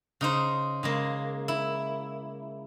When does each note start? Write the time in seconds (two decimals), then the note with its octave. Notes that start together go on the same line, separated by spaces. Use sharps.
0.21 C#3 D#4 C5
0.83 C#3 G#3 A#3
1.48 E4